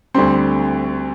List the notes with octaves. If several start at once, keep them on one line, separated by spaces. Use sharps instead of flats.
D2 D3 G3 C4 C6